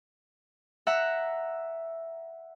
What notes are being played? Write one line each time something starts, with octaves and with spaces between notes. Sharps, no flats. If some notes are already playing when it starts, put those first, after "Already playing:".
E5 F#5 A#5 F#6